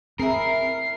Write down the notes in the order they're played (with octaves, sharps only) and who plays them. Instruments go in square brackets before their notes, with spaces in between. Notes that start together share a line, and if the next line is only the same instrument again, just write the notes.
[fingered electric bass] C4 [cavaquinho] E4 G#4 [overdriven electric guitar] A#4 [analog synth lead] C7